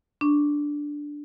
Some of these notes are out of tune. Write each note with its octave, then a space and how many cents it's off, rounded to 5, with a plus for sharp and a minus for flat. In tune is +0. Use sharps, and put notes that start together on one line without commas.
D4 +0 C#6 -10